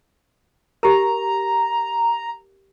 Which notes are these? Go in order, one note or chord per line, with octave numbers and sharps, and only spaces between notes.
G4 A#4 A#5